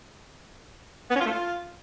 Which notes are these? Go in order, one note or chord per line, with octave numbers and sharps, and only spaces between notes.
B3
C#4
F4
A3
F4